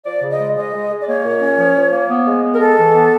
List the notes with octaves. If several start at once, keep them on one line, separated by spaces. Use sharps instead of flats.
F3 D5
C#3
D#5
G#3
G#3 D#5
G#3
G#3
D5
A#3 C#5
A#2
C#4
F3
F3
A#3
B3
G#3
B3
A#4
G#3 A4
E3
B3